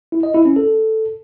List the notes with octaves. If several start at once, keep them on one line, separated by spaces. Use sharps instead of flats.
E4
D#5
E4
C#4
A4